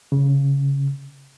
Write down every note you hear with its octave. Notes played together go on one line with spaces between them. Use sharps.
C#3